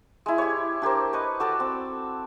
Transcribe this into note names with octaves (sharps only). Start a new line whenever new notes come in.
G#3 E4
G4 C#5
D4 G4 A#4 C5
B4 D#5 C#6
F#4 A4 D5
C4